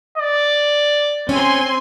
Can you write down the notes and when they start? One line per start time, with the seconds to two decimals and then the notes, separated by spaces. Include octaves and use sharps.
0.18 D5
1.29 C4 C#4 G#5 C6